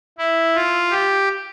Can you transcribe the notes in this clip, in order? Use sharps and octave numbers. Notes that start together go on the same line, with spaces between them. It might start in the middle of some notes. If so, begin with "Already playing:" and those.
E4
F4
G4